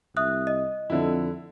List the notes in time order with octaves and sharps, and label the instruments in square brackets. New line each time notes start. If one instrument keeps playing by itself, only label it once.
[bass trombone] C2 [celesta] E5 D#6 F#6
[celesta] D#5
[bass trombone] F2 [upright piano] D3 E4